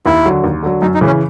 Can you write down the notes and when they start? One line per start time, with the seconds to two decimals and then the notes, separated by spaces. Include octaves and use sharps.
0.06 D#2 E4
0.25 D3 F#3
0.44 D#2
0.63 D3 F#3
0.82 F#2 D#4
0.94 D#4
1.01 C#3 E3
1.07 C#4